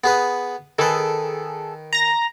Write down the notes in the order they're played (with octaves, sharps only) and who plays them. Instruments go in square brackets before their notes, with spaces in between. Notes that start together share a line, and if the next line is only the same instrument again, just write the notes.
[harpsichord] B3 G#4 B4
[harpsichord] D#3 B4 [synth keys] G#4 A4
[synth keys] A#5 A#6